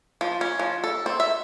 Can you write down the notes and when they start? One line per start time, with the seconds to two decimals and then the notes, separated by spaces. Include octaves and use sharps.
0.21 F3
0.41 C#4
0.59 F3
0.84 A4
1.06 C4
1.20 E5